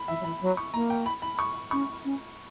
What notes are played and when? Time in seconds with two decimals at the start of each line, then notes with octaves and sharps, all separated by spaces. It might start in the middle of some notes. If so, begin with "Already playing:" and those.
Already playing: B5
0.08 E3 E5
0.20 F#3
0.24 E3 B5
0.41 F#3
0.57 C#6
0.74 A#3 A#5
0.90 G5
1.06 B5
1.22 B5
1.39 C#6
1.71 C#4 C#6
2.04 C#4